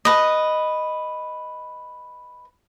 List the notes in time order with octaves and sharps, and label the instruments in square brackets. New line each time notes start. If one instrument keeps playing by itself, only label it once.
[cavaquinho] B4 D#5